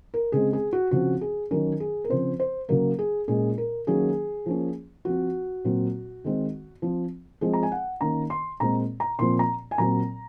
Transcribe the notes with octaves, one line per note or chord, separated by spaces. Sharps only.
A#4
C#3 G#3 C4 G#4
G#4
F#4
C#3 F3 C4 F#4
G#4
D#3 F#3 C#4 A#4
G#4
A#4
C#3 F3 C4 C5
C5
C#3 F#3 A#3 A#4
G#4
A#2 G#3 C#4 G#4
A#4
D#3 F#3 A#3 C#4 G#4
F3 A#3 C#4
F3 C4 F#4
A#2 F#3 C4
D#3 G#3 C4
F3 C4
F3 G#3 C4 G#4
A#5
G#5
F#5
D#3 A#3 C#4 A#5
C6
A#2 G#3 C4 A#5
A#5
A#2 F3 C4 C6
A#5
G#5
A#2 F#3 C4 A#5